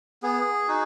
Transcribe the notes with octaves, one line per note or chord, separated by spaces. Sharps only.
B3 G#4
D#4 F#4